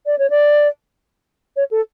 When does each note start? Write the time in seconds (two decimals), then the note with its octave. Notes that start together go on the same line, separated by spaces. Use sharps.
0.06 D5
0.18 C#5
0.30 D5
1.56 C#5
1.71 A4